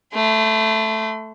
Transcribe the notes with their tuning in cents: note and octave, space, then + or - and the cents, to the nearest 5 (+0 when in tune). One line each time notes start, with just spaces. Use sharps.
A3 +0 C6 -45